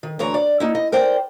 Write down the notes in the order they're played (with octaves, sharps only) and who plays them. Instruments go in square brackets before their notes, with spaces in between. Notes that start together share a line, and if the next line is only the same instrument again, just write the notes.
[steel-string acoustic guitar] D#3
D2 E3 C#5 A#5
D5
A#3 D#4 E4
D#5
A#4 C5 D5 G5